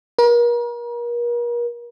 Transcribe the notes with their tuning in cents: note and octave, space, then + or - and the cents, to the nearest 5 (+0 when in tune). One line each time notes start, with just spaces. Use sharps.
A#4 +40